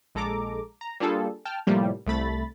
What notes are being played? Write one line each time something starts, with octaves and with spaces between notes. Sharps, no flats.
A#1 G#3 A4 A#5 D6
A#5
G3 A#3 D4 F4 G#4 A4
G5 A5 F6
A2 C3 F3 G3 A#3
C2 A3 B5 A6